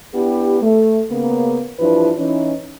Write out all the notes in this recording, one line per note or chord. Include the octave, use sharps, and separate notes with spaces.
B3 D4 E4 G4
A3
C#3 A#3 B3
G2 E3 F3 D4 E4 B4
E3 C#4 D#4